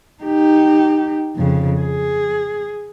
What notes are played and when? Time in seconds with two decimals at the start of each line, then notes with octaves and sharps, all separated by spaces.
0.23 D#4 G4
1.36 F2 C#3
1.80 G#4